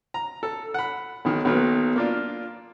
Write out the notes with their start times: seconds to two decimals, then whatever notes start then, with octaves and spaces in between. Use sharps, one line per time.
0.14 A#5
0.43 A4
0.74 F#5 B5
1.25 B1 D#3
1.45 B1 D#3 F#3 A#3 B3
1.96 A#3 D4 F4